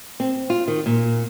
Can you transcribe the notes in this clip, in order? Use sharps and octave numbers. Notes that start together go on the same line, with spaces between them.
C4
F4
D#3
A#2